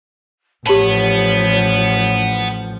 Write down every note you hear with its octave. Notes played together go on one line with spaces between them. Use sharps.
A1 F3 B3 G4 C#5 A5 B5